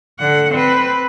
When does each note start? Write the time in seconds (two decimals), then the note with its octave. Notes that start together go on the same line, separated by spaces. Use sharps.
0.19 D3 F#5
0.52 C4 B4